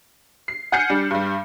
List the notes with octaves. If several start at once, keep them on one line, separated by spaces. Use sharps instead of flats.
C7
F#5 G#5 F6 G6 C7 C#7
G3 D4
G2 G3